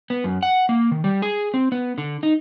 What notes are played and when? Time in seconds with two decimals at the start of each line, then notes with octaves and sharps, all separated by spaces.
0.10 B3
0.24 F#2
0.43 F#5
0.69 A#3
0.91 D#3
1.04 G3
1.22 G#4
1.54 C4
1.72 B3
1.98 D3
2.23 D#4